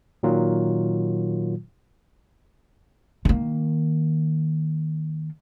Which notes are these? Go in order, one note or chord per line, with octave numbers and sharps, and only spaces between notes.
A#2 D#3 F#3 F4
D#3 A#3